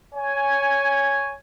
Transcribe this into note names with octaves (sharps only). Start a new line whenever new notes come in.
C#5 G#5